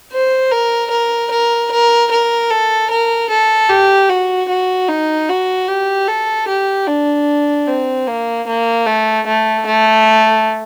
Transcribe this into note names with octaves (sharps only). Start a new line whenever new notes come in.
C5
A#4
A#4
A#4
A#4
A#4
A4
A#4
A4
G4
F#4
F#4
D#4
F#4
G4
A4
G4
D4
C4
A#3
A#3
A3
A3
A3